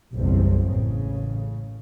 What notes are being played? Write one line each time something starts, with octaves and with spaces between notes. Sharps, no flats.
F#1 B1 E2 G3 C4
A1 C#3